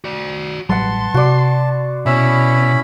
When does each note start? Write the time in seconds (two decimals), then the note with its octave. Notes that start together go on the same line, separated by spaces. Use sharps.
0.04 F#4 D5
0.70 A1 F#3 G3 B4 F#5 A5 C6
1.14 C3 F#4 D5
2.06 B2 C#4 E4 B5 E6